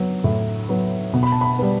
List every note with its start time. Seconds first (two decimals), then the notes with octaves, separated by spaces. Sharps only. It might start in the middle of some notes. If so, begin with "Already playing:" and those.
Already playing: F#3 B3
0.24 A2
0.69 F#3 B3
1.13 B2
1.23 B5
1.32 A5
1.41 B5
1.59 G3 B3